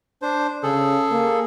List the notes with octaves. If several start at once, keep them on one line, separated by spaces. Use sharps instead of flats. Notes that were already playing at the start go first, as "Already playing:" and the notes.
D4 C5
C#3 G#4 A4
A#3